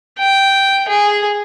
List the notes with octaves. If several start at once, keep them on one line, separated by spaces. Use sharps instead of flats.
G5
G#4